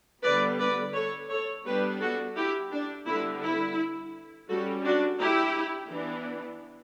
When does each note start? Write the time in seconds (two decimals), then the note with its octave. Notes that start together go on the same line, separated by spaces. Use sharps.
0.23 D3 G3 B3 B4 D5
0.59 B4 D5
0.94 A4 C#5
1.29 A4 C#5
1.65 G3 B3 D4 G4 B4
2.01 F#4 A4
2.36 E4 G4
2.72 D4
3.07 D3 G3 B3 E4
3.43 E4
4.49 G3 C#4 F#4 A4
4.85 D4 F#4
5.20 E4 G4
5.92 E3 B3 D4